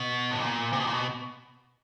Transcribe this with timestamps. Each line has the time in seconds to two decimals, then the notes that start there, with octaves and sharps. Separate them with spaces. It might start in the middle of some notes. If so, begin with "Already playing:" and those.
Already playing: B2
0.31 A2
0.40 A#2
0.73 C3
0.80 B2
0.87 A#2
0.94 B2